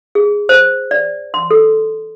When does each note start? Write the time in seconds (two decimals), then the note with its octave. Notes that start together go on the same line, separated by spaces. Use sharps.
0.15 G#4
0.49 C5
0.91 D5
1.34 C6
1.51 A4